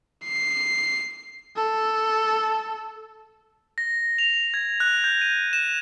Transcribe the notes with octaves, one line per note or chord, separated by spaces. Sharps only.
C7
A4
A#6
F7
G#6
F#6
G6
D#7
E7